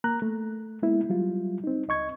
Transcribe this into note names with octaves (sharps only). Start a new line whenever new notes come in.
A#3 A#5 F#6
A3
G#3 A#3 B3 E4
F#3 G3 F4
C4 D#4
C#2 D#5 C#6 G#6